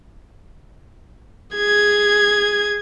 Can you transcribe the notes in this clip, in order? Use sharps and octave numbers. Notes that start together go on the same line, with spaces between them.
G#4 G#6